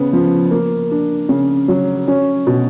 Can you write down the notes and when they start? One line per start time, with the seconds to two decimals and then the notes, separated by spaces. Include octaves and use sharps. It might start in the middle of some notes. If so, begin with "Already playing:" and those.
Already playing: C#3 B3
0.13 F3
0.51 A#3
0.91 D4
1.29 C#3
1.68 F#3
2.08 C#4
2.47 B2